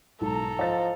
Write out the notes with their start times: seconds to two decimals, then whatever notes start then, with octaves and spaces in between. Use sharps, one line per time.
0.21 B1 G#2 A4 A#5
0.59 F3 D#5 A6